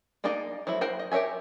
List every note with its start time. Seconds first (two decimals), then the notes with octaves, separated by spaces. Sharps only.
0.24 A#3 D4 D#4 D5 D#5
0.67 F3 F#3 A3 E4
0.81 A#4 C5 F#5 G5
0.99 D#5
1.12 G4 A#4 C#5 E5 G#5